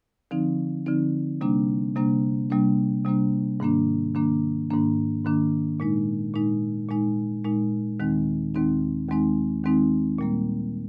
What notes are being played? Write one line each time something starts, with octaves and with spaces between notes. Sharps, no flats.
D3 F3 C4 D#4
D3 F3 C4 D#4
C3 G3 A#3 D4
C3 G3 A#3 D4
C3 G3 A#3 D4
C3 G3 A#3 D4
G#2 D#3 A#3 D4
G#2 D#3 A#3 D4
G#2 D#3 A#3 D4
G#2 D#3 A#3 D4
A#2 G#3 D#4
A#2 G#3 D#4
A#2 G#3 D#4
A#2 G#3 D#4
D#2 D#3 G#3 C4 D#4
D#2 D#3 G#3 C4 D#4
D#2 D#3 G#3 C4 D#4
D#2 D#3 G#3 C4 D#4
A#2 G3 A#3